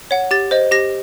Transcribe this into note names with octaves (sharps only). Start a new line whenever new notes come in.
C#5 F#5
G4 A6
C5 D#5
G4 A#6